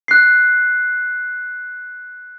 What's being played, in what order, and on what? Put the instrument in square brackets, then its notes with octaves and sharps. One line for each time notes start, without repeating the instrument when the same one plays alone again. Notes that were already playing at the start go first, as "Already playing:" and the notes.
[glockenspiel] F#6 C7